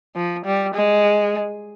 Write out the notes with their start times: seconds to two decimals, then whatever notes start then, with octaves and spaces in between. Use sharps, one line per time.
0.15 F3
0.45 G3
0.74 G#3